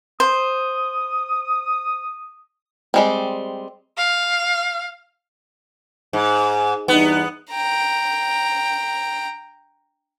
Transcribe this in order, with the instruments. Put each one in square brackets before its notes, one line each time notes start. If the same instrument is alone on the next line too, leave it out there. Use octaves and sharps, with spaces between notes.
[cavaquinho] C5 [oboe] D#6
[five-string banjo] G3 G#3 C4
[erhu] F5
[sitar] G#2
[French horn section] E2 G2 D#4 [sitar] B3
[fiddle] G5 A#5